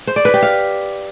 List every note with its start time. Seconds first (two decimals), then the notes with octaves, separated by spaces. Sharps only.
0.07 C5
0.16 D5
0.25 B4
0.34 G4
0.42 F5